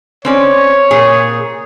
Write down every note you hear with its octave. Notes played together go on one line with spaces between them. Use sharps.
C4 C#4 C#5 D5
A#2 G#4